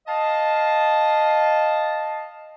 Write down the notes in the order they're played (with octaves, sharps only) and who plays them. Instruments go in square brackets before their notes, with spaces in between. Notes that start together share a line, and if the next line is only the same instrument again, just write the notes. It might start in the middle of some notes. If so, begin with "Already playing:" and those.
[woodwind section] D#5 F5 A5